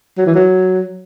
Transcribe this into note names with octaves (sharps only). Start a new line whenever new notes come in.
F#3
E3
F#3